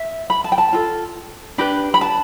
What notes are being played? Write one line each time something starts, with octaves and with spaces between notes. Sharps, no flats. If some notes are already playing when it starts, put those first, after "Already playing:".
Already playing: E5
B5
A5
G5
A5
F4 A4
D4 G4 B4 B5
B5
A5